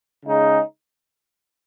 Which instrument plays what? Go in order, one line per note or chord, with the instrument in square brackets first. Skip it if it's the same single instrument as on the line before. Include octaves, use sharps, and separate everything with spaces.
[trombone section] C#3 G#3 D#4